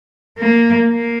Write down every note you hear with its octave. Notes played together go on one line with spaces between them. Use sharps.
A#3
A#3